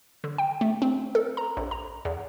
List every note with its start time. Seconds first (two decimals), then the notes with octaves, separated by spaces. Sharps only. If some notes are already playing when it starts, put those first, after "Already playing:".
0.24 D3
0.38 G5
0.61 A3
0.82 C4
1.15 A4
1.37 A#5
1.57 A#1
1.71 A#5
2.05 E2